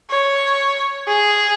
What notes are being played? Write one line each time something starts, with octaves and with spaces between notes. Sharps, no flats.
C#5
G#4